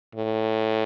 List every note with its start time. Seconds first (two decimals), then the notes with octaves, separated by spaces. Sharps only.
0.15 A2